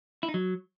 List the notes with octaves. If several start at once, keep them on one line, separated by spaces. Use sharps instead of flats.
E4
D#4
F#3